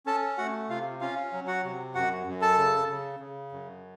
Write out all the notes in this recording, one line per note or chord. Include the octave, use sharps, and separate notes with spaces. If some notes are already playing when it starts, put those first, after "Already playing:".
C#4 A4 A5
A3 F#4 F#5
C3 F4 F5
C#4 F4 F5
F#3
F#4 F#5
C3
F#2 F#4 F#5
F#2
A4 A5
C#3
C#3
C#3
F#2